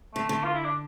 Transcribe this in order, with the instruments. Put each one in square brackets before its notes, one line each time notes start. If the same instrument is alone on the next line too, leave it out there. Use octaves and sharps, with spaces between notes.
[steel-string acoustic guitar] D3 [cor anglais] A3
[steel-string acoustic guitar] D3 [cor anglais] A3
[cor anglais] F4
E4
D4